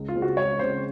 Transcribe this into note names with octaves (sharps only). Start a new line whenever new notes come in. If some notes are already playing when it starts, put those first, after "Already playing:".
Already playing: C#2
F4
C#3 G#3 C4
F#4
C#2 C#5
C#3 G#3 C4 C5